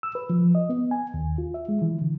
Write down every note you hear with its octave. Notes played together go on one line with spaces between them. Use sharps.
E6
B4
F3
D#5
B3
G#5
D#2
F4
E5
G#3
E3
D3